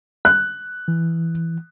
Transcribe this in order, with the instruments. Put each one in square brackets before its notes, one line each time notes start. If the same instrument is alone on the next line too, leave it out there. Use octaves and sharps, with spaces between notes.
[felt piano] F#6
[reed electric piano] E3